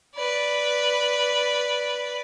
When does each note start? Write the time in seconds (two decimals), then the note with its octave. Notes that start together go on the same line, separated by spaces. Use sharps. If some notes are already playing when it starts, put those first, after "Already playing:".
0.15 B4 D5